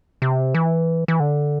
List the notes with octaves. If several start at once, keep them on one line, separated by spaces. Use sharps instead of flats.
C3
E3
E3
D3